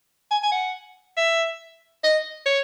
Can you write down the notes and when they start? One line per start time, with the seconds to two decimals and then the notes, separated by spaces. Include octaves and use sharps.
0.31 G#5
0.43 G#5
0.52 F#5
1.17 E5
2.04 D#5
2.46 C#5